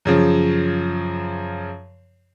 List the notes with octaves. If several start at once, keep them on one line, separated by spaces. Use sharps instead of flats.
F#2 C#3 F3